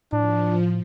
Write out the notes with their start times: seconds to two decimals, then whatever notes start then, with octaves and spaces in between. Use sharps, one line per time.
0.13 A2 F3 D4